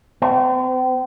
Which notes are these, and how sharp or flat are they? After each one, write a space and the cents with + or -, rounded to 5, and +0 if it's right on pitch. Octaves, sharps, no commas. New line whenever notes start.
C4 -40